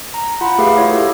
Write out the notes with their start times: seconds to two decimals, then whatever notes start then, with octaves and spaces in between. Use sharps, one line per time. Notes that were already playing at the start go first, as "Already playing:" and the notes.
0.14 A#5
0.41 F4 F#5 B5
0.58 A3 G4 G#4 B4 F5
0.78 E4 F4 C#5 D#5
0.91 G4 A4